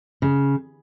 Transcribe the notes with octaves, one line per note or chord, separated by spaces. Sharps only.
C#3